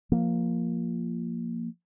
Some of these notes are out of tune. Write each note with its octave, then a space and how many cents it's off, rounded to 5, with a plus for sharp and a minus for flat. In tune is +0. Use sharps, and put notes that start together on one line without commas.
F3 +0 A#3 +0